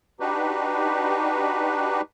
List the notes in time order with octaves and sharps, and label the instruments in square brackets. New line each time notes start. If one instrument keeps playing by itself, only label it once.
[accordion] D4 D#4 F#4 G4 B4